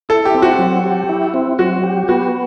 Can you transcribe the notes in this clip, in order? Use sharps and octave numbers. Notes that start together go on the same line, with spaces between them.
E4 A4
G4
C4
F#4
F#3
G4
E4
C4
F#3 F#4
G4
B3 F#4